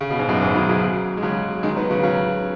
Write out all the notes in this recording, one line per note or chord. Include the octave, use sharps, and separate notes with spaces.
C#3
B2
G#2
F#2 B2
G#2 C#3
B2 D#3
C#3 F#3
G#3
C#3 F#3
D#3 G#3
F#3 B3
C#3 F#3
C#3 F#3